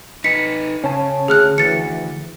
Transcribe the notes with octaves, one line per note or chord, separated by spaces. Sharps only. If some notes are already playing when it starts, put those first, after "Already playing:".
D#4 B4 B6 C#7
C#3 C#4 C#5 A5
D2 G#4 F6 F#6
D2 E3 A6 C#7